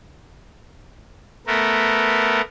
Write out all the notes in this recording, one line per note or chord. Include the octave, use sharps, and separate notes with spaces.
A3 B3 A#4